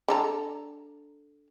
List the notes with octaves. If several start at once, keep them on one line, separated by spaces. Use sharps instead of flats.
D3 A4 A#5